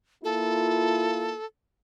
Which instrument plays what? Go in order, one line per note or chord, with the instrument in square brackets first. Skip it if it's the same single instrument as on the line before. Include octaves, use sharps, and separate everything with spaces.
[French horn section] A#3 E4 F4 [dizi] A4